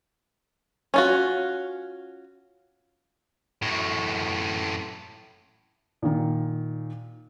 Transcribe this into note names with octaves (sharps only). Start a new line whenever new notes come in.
C#4 F4 F#4
F#2 A2
A#2 D#3